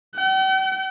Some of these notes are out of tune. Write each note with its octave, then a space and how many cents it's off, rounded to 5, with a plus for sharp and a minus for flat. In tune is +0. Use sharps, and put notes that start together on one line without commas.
G5 -45